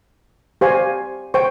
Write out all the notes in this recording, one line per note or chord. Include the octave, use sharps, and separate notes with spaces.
G4 C5 F5 G#5 C#6
C5 G5 C#6